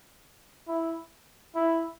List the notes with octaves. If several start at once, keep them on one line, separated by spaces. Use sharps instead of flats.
E4
E4